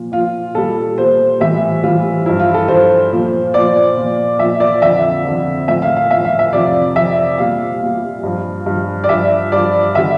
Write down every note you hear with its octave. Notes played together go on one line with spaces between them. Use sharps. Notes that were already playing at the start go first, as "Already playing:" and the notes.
Already playing: A#2 F3
A#2 F3 F4
A#2 G3 A4
A#2 G3 C5
A2 E3 G3 E5
A2 E3 G3 F4
G2 F3 E4
F4
A4
G2 F3 C5
A#2 F3
A#2 F3 D5
A#2 F3
A#2 F3 E5
D5
F2 D3 F3 E5
F2 D3 F3
A2 F3 E5
F5
F5
A2 F3 E5
F5
E5
F2 C3 F3 D5
F2 C3 F3 E5
A#2 G3 F5
A#2 G3
G2 F3
G2 F3
D5
G2 F3 E5
G2 F3 D5
D3 G3 E5